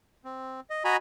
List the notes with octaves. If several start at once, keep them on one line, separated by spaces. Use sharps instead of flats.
C4
D#5
F#4 D#5 G#5 A#5 B5